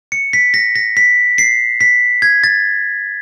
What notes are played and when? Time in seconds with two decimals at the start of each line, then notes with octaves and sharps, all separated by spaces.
0.12 C#7
0.33 B6
0.54 A#6
0.75 A#6
0.97 B6
1.38 C7
1.81 B6
2.22 G#6
2.44 A6